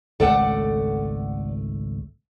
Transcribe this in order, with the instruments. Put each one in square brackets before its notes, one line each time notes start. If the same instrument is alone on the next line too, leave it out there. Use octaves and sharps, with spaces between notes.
[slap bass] G#1 C#2 A3 [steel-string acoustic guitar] A4 D5 F#5